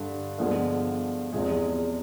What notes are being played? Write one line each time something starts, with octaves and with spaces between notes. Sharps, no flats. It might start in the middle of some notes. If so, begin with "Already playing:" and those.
Already playing: G2 D3
G2 D3 F3 G#3 B3
E2 C3 F3 G#3